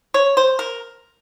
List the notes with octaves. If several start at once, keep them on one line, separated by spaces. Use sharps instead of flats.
C#5
C5
A#4